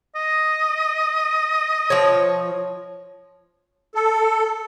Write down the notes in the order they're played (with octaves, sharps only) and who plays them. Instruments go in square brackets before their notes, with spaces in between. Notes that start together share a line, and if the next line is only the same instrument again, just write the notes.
[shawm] D#5
[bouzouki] F3 C#5
[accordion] A4